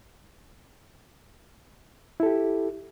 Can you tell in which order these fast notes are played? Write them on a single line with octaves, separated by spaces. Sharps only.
E4 A4 G4